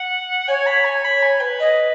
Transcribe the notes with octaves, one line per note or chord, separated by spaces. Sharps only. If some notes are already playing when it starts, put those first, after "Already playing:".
Already playing: F#5
C#5 G#5
B5
G#5
B5
G#5
B4
D#5